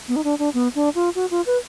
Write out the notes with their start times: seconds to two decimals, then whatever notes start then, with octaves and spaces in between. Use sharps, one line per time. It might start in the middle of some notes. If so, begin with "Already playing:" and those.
0.08 B3
0.16 D#4
0.24 D4
0.39 D4
0.54 B3
0.75 D4
0.95 F4
1.15 F#4
1.31 F4
1.46 B4